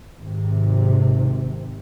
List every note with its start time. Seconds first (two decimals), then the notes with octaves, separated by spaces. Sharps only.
0.20 G#1 C3